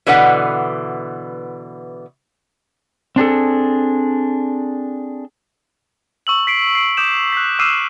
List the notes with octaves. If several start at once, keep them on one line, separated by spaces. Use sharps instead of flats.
B2 D3 E3 B4 F#5
C4 D4 G#4 A4
C#6 E6 F#7
B6 C7 D7
C7 D7
D6 D#6 G6 E7
F#6 B6
D6 E6 F6 C7 D#7 E7